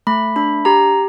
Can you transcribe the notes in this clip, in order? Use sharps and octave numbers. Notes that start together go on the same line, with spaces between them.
A3 B5
D4 B5
G4 A#5